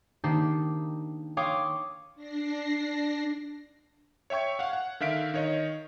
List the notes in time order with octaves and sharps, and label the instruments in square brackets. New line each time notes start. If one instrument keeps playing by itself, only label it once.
[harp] D#3 A#3 D4 D#4 G4 C5
C#5 F5 G5 C6 D6 D#6
[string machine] D4 A#6 C7
[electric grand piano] C#5 E5 G5 C#6 G#6
F5 F#5
F#5
D3 D#3 E5 F5 B6 D7
D#3 C#5 D#5